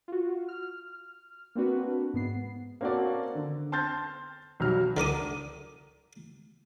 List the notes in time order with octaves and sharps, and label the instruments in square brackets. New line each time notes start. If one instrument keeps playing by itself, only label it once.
[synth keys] F4 F#4
F6
A#3 C4 D4 F#4 B4
G#2 B3 C7
[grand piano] A#3 C4 C#4 F#4 A4 D5
D3
A5 C6 F6 G6 A6
B1 F#3 G3 F6
[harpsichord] D3 A#4 D6 D#6